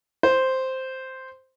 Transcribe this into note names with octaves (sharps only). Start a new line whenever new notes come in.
C5